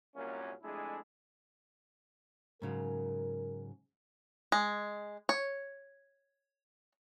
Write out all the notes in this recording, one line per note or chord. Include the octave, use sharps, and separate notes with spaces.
C2 F#2 A#2 A#3 C#4
F2 G#3 A3 D4 E4 G#4
G#2 C#3 F#3 A#4
G#3
C#5